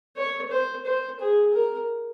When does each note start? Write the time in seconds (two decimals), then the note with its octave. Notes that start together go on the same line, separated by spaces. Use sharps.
0.17 C#5
0.51 C5
0.85 C5
1.20 G#4
1.54 A#4